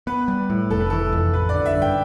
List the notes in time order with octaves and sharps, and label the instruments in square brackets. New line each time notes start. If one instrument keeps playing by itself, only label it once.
[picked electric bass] B3 [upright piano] B4
[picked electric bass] G3
A2
[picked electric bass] F1 [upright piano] A4
[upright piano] B4
[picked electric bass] E3 [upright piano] A4
[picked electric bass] F2
[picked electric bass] A1 [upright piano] B4
[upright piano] D5
[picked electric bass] D3
[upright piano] E5
[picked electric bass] G2
[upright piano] G5